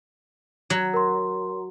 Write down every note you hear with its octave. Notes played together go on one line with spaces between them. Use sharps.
F#3
A#4 C6